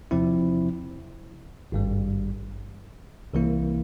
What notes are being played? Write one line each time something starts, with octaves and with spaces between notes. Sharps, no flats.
E2 C3 F3 C4 E4
G#1 G2 G3
C2 C3 E3 A#3 E4